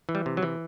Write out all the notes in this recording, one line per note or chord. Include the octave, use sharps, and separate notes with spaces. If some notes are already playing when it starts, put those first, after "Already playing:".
E3
G3
C3
F#3
E3